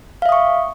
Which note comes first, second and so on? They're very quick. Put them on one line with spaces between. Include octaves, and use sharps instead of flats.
F5 E5 D#6 C#6